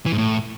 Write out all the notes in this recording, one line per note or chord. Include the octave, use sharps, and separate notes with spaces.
E3
G#2
A2